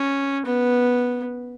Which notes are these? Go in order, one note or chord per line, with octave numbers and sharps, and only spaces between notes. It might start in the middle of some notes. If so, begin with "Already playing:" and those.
Already playing: C#4
B3